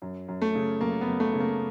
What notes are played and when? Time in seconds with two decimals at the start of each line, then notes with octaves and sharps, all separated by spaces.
0.02 F#2
0.28 F#2
0.42 A3
0.55 C#3
0.81 F#2 A#3
1.01 B3
1.07 F#2
1.20 A3
1.34 C#3
1.40 A#3